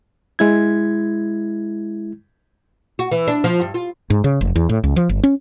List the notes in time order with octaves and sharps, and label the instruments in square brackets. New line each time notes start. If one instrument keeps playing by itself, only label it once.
[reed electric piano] G#3 E4 G#6
[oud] F#4
E3
D4
F3
G2
F4
[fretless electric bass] G#2
C#3
F1
E2
A2
C#2
F3
G1
C#4